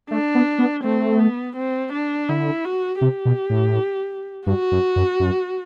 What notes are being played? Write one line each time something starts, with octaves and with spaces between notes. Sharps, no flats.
A3 D4
B3
B3
A3 C4
B3
C4
D4
D3 E4
F#4
C3 G4
B2
A2
G2 F#4
F#2
F#2
F#2